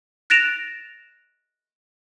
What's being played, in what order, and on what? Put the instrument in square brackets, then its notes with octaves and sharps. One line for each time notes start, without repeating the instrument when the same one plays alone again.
[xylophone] F#6 A6 A#6 D7 E7 F7